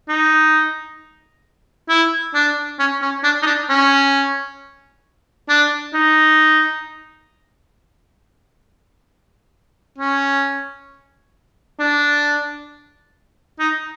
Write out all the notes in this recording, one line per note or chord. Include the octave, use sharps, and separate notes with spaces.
D#4
E4
D4
C#4
C#4
D4
D#4
D4
C#4
D4
D#4
C#4
D4
D#4